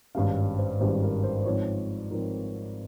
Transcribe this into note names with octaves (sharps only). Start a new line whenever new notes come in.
G#1 G2 G3 C#4 F5
C5
G#1 G2 G3 C#4 C5
A#4
C5
C5
G#2 F3 C4 C#5
G#2 F3 C4 A#4